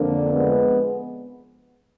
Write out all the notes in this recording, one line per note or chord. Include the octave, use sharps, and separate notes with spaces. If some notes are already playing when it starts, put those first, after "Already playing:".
Already playing: F2 D3 F3 A#3 D4
G#3 B3